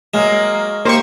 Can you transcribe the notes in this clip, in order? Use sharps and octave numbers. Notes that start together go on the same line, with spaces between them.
F#3 G#3 A#3
A#3 G4 C5 C#6